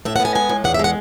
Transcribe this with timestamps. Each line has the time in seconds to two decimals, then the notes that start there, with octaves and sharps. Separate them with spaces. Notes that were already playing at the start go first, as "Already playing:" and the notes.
0.05 A2 E5
0.16 F#5
0.20 B3
0.25 G#5
0.35 G#3 G#5
0.49 A2
0.64 E2 F#5
0.74 E5
0.79 G#3 F#5